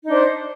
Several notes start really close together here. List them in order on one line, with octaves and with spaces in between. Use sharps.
D#4 D4 C5